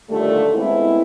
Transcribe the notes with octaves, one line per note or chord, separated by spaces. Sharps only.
D#2 A#2 D3 G3 A3
G#3 B3 C4 E4